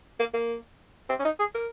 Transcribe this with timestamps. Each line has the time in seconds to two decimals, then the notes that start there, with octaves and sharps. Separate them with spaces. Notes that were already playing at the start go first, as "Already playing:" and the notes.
0.19 A#3
0.34 A#3
1.09 C4
1.19 C#4
1.25 D#4
1.39 G#4
1.55 A#4